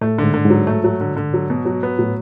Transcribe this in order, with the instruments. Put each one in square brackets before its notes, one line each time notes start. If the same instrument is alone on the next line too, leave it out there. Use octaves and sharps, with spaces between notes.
[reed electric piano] A2 [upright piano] A3
[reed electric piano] G#2 [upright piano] D3
[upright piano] D3
[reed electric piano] G#2
[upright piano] F#3
A3
F#3
D3
D3
F#3
B2
F#3
B3
[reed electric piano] A2 [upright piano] F#3